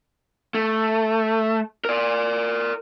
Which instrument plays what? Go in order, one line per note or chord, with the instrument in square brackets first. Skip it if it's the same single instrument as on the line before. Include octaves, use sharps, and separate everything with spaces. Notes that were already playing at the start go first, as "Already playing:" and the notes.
[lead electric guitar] A3
A#4 D5